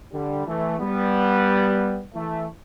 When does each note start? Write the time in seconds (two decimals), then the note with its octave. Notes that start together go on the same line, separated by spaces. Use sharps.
0.12 D3 G3
0.46 E3 A3
0.79 G3 B3
2.14 E3 A3